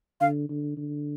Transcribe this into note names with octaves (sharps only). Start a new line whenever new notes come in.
D3 F5
D3
D3